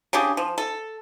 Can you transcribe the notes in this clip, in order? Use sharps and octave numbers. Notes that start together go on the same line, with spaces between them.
C#3 D4 G4 G#4
F3
A4